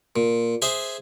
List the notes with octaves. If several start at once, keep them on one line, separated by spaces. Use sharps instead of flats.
A#2
G#4 C5 E5 G#5